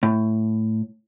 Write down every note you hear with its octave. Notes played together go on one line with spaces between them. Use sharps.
A2